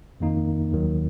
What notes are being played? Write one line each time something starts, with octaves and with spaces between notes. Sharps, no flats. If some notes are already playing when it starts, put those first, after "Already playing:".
F2 D#3 A#3 D#4
D#2 D#3 F#3